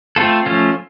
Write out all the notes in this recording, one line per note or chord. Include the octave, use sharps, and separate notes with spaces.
A3 C4 F4 A4
F3 A3 C#4 F4